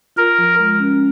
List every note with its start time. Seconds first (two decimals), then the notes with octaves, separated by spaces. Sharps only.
0.16 F4 A#4
0.38 F3
0.59 G#3
0.79 C#4